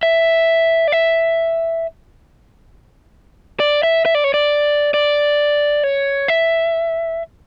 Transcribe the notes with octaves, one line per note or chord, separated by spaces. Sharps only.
E5
D5
E5
D5
E5
E5
D5
C#5
D5
D5
C#5
E5